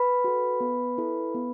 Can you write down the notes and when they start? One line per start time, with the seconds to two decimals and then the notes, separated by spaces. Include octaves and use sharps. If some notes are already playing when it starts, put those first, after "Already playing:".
Already playing: B4 B5
0.24 F#4 A4
0.60 B3
0.98 E4 A4
1.35 B3